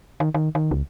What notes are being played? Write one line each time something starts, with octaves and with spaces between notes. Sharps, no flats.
D#3
D#3
D#3
C#2